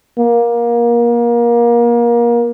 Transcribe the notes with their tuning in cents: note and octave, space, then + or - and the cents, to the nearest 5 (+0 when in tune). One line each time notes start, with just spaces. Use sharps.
A#3 +25